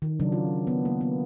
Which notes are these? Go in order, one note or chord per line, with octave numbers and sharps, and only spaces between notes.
D#3
C#3 F#3 D4
F4
B3
A#3
B3